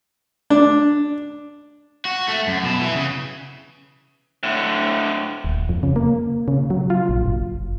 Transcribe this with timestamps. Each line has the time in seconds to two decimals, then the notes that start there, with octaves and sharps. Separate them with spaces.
0.50 D4
2.05 F#4
2.28 A3
2.47 F#2
2.64 B2
2.80 E3
2.96 C#3
4.43 A2 D3
5.45 D#1
5.69 F2
5.83 C#3
5.96 A#3
6.48 C#3
6.70 F#3
6.90 F4
7.09 A#1
7.26 F#1